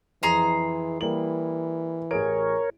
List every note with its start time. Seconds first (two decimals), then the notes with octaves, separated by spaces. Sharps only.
0.23 F2 E3 G#4 A#5 C6
1.01 E3 G3 A#3 F#7
2.11 A1 G#4 A#4 C#5 D7